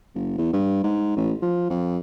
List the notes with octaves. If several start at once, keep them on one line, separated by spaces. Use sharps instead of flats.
F#1
E2
G2
G#2
A1
F3
F2